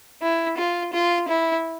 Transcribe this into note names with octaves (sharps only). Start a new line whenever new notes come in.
E4
F4
F4
E4